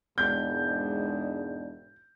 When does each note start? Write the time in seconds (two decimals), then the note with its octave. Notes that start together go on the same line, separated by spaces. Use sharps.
0.18 E1 G#2 D4 G6